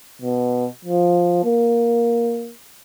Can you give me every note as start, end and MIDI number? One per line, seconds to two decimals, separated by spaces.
0.22 0.67 47
0.85 1.40 53
1.45 2.52 58